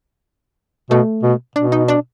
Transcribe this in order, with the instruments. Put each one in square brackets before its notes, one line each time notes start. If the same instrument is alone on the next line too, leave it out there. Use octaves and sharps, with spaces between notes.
[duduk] B2 [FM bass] A3
[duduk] B2
[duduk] B2 [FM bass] D4
[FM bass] D#4
D4